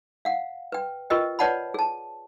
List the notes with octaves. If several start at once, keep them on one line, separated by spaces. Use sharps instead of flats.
F5 F#5
B4 G5
F4 G4 A#4 B4 D#5 G5
B4 C#5 D5 F#5 A5 B5
G#4 A5